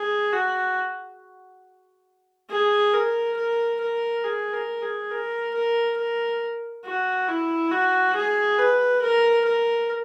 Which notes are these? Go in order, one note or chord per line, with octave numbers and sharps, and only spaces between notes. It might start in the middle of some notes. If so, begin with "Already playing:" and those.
Already playing: G#4
F#4
G#4
A#4
A#4
A#4
G#4
A#4
G#4
A#4
A#4
A#4
F#4
E4
F#4
G#4
B4
A#4
A#4